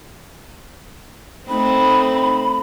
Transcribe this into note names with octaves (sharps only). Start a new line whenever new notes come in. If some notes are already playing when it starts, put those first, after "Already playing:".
A3 C4 D#4 B5